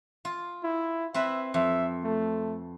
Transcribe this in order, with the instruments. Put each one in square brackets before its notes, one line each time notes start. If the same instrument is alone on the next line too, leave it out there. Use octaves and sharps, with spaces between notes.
[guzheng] F4
[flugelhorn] E4
[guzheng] C4 E4 B4 [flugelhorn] E5
[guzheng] F2 [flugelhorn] E5
[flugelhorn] A3